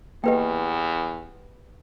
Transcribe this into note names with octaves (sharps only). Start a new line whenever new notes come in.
E2 A#3 G4 A4 B4 D#5 G5